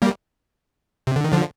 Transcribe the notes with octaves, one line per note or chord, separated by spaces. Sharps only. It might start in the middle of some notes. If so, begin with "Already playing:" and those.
G3 A#3
C3
D3
D#3
D3 F3